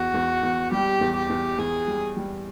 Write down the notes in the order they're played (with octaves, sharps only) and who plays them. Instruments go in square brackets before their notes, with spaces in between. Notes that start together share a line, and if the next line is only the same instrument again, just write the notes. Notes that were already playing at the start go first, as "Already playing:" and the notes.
Already playing: [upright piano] E2 [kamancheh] F#4
[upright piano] E2
E2
[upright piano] G3 [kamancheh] G4
[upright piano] E2
[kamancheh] G4
[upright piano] E2
[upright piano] E2 [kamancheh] G#4
[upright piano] G3
G3